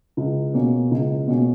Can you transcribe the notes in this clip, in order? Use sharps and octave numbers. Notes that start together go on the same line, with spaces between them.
C#2
B2 A#3 C#4
C#2
B2 A#3 C#4